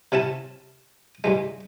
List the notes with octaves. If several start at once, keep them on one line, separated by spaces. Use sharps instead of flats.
C3 C#4 E4 A5
G2 E3 G#3